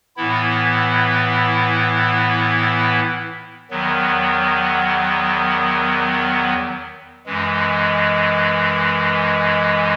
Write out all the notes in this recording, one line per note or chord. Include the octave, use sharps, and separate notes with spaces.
A2 E3 B3 E4
E2 D#3 F#3 B3
F#2 E3 G#3